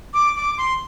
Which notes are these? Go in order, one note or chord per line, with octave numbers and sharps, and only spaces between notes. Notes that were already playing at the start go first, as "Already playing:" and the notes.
D6
D6
C6